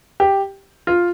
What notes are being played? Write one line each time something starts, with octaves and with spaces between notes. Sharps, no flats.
G4
F4